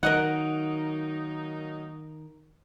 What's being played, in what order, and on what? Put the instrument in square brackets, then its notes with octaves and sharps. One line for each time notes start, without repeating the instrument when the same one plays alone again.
[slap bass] D#3 [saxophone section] F#3 A#3 D#4 [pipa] A#4 D#5 F#5